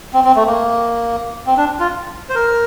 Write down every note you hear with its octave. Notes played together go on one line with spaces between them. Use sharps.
C4
C4
A3
A#3
C4
D4
F4
C5
A#4